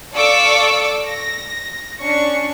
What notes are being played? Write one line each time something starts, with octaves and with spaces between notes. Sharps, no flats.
A4 D5 F5 C#6 D6 E6
A#6
C#4 D4 C#6